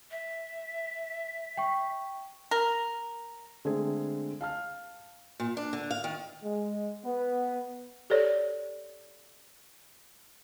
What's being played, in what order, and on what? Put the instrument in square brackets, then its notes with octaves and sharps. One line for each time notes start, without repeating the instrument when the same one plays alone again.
[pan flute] E5
[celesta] G5 C#6
[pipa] A#4
[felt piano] D3 G#3 A3 C4 G#4
F5 A5 F6
[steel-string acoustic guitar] A#2
D4
D3
F5
D#3
[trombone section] G#3
B3
[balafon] G4 A4 C#5 D5